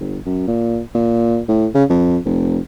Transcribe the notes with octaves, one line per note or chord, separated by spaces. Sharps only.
G1
F#2
A#2
A#2
A2
C#3
F2
F1